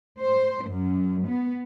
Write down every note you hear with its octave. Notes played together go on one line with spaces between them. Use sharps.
C5
F#2
B3